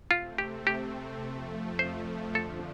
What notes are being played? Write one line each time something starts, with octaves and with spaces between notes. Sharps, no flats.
C3 A3 C4 F4
G4
G4
F2 F3 A3
C5
D3 F3 D4 A4